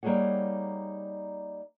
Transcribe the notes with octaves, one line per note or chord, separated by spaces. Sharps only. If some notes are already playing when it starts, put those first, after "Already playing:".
G3 A#3 D#4 G#4 C#5 F#5